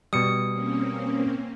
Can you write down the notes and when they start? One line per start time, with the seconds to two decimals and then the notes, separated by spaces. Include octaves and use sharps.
0.13 B2 G3 D#6 C#7
0.53 A#3 C4 C#4